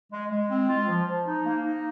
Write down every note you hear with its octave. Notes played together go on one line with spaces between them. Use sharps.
G#3
G#3
C4
F4
F3
F3
D#4
A#3
D#4